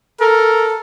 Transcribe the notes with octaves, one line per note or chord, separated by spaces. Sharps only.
A4 A#4